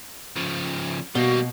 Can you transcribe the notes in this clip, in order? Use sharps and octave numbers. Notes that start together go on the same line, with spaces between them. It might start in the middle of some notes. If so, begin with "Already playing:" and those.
C#3 F3
B2 G3 A#3 F#4